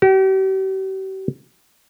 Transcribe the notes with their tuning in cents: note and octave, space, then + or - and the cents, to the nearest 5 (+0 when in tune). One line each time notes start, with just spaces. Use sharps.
G4 -45